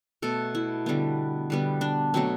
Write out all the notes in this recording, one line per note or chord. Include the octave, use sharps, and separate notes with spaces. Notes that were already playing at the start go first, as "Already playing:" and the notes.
B2 A3 A4
E4
D3 G3 B3
D3 G3 B3
D4
B2 F#3 A3 C4